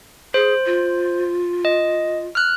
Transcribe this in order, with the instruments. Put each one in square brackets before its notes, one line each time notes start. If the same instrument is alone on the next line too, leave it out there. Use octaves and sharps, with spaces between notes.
[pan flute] G#4 [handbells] C5
[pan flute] F4
[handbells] D#5
F6 F#6